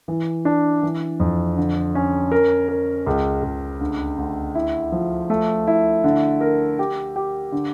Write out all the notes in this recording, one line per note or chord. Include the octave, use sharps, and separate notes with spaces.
E3
D4
E3
F2
D3
C#4
A#4
A#4
C#2
C#2
D2
D2
E4
F3
A3
E4
D3
A#4
G4
G4
D3